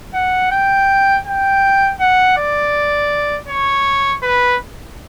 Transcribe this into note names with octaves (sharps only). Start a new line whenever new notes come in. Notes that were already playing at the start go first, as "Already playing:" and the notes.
F#5
G5
G5
F#5
D5
C#5
B4